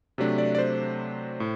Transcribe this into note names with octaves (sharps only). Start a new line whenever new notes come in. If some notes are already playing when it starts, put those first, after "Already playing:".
C3 F#3 A3 D4
D5
D5
C5
A2